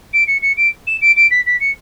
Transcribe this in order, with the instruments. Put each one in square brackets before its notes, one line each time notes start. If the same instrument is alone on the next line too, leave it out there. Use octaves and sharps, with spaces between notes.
[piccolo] D7
C#7
C#7
D7
E7
D7
D7
B6
B6
C#7